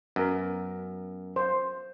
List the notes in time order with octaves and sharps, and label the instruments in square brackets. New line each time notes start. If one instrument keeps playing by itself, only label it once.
[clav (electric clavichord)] F#2 [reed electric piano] B3 A#4
[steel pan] C5